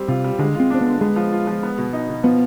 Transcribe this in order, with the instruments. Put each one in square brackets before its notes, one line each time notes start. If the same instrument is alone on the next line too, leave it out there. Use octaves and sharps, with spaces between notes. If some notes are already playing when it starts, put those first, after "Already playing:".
Already playing: [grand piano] G3 C4
[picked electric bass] C3 [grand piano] F4
[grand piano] G3
[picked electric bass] D3 [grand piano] G#3
[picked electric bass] C4 [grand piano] F4
[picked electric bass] C4 [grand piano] D4
[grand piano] D3 [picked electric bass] B3
[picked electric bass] G#3 [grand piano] B3
[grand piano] F3
F4
F3
B3
B2
D#4
B2
[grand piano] F3 [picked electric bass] B3